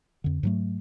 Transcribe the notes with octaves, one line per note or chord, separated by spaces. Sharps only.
F2 D3
G#2 F#3 A3